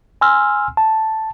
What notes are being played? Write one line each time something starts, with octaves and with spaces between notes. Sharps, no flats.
G#5 C6 E6 F6
A5